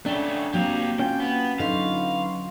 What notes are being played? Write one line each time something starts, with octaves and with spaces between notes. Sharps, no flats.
C#3 A3 C#4 D4 G5
F#3 A#3 C4 G4 F5
C#4 F4 G5
B3
D3 F#3 D#4 B4 F5 C6 C#6